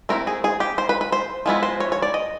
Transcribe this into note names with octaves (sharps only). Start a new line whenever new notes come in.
A3 C4 E4 A#4
G#4
G#4
G4
C5
B4
B4
C5
F3 G#3 B3 E4
C5
C#5
C#5
D5
D#5